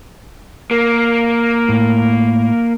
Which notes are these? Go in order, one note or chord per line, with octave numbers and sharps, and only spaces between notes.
A#3
A2